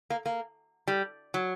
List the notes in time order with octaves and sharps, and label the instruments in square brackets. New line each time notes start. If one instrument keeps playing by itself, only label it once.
[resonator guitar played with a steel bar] A#3
A#3
G3
F#3